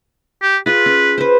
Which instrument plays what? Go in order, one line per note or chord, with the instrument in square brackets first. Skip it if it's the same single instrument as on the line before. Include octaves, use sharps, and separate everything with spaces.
[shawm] G4
[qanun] F4 G#4 [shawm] B4
[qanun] C#4
B4 C5